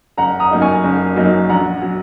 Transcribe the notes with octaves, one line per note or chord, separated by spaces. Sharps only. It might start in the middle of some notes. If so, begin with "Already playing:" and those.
F#1 F#5 A#5
A#5 D#6
F#2 F#3 A#3 D#4
G#5 C#6
F#1
F#2 F#3 A#3 D#4
A#1 F#5 A#5
F#3